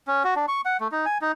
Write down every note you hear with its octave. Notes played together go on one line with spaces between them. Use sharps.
C#4
F#4
D4
C#6
F#5
A3
D#4
G#5
D#4